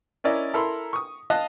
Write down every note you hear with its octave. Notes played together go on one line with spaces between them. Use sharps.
C#4 E4 A#4 D5 D#5
E4 A4 A#4 B5 C6
C#6 D#6
D#5 F5 A5 D#6 F#6